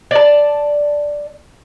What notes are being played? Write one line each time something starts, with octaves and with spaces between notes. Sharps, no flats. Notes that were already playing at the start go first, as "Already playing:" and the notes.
D5 A5